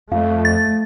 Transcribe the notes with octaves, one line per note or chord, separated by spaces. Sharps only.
F2 A3 F5
A6